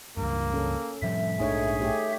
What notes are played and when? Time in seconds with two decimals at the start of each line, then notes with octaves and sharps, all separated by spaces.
0.17 C#2 G2 A#3
0.52 C#4 A4
1.02 A2 F3 G3 E5
1.39 A#1 G#2 A3 D4 D#4 G#4 C#5
1.81 A3 G4 C#5